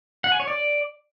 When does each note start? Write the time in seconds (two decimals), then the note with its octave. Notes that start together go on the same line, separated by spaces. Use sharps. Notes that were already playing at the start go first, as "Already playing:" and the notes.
0.24 F#5
0.32 G#5
0.40 C#5
0.47 D5